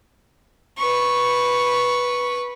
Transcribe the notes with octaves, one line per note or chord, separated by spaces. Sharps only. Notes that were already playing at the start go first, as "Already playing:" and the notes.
B4 C#6